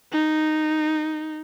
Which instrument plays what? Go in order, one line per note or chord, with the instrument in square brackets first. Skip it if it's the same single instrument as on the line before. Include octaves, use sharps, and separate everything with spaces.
[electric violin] D#4